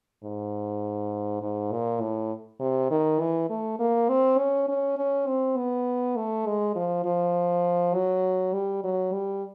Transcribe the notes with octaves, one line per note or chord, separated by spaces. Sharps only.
G#2
G#2
A#2
A2
C3
D#3
E3
A3
A#3
C4
C#4
C#4
C#4
C4
B3
A3
G#3
F3
F3
F#3
G3
F#3
G3